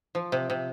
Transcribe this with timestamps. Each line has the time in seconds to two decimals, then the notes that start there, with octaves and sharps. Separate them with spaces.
0.15 F3
0.32 C3
0.50 C3